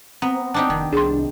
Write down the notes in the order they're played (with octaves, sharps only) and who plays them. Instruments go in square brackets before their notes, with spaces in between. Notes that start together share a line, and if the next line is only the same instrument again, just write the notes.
[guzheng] B3 [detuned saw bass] C4 [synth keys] A#5
[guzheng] D4 D#4 G4
[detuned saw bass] F1 [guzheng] D#3
[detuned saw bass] C2 [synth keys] D4 [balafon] G#4 C6